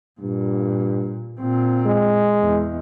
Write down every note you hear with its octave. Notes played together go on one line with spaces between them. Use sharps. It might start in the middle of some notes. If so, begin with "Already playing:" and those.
G2 A#2
A#2 C4
G#3
E2